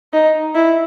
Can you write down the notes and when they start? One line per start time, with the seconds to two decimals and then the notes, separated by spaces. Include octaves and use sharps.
0.13 D#4
0.55 E4